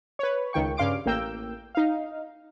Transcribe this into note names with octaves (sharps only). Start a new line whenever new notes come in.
B4 C#5
C#2 D#3 G5 C#6
G2 C#3 F5 C6 D6 D7
A1 A#3 G5 E6 G6
D#4 F5